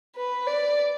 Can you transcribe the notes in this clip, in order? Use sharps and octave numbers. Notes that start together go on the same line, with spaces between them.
B4
D5